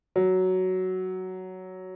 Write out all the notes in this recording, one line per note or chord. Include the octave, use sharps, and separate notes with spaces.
F#3